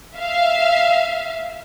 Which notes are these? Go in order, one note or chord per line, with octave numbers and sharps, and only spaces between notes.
E5 F5